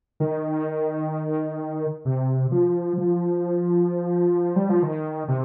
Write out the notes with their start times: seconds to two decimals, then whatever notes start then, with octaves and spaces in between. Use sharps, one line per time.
0.20 D#3
2.05 C3
2.52 F3
2.98 F3
4.56 G3
4.69 F3
4.82 D#3
5.28 C3